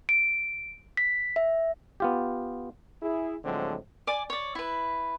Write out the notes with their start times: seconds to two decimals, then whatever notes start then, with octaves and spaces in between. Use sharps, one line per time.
0.09 D7
0.97 B6
1.36 E5
2.00 B3 F4 G4
3.02 E4 G#4
3.44 A2 D3 F3 F#3 G#3 C4
4.07 D5 G#5 D6
4.30 C#5 D5
4.55 E4 B4